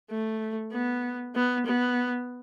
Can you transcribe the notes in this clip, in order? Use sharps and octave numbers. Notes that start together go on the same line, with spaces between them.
A3
B3
B3
B3